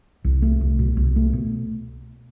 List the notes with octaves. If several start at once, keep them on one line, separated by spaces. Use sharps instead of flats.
C2
A3
C2
B2
C2
A3
B2